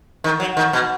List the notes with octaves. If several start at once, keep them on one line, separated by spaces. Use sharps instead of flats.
D#3
F#3
D#3
B2